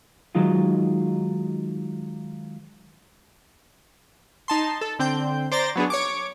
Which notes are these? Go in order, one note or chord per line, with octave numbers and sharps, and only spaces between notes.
D#3 F#3 G#3 D#4 F4
D#4 A5 C6
A4
D3 C4 G5 G6
C5 D5 A#5 A6 A#6
F#3 B3 D4 G#4
C#5 C#6 D6